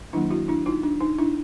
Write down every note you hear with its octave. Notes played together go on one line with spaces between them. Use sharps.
D#3 F#3 A#3 D4 E4
E4 F#4
D4 E4
D#4 F4
D4
D#4
D4 E4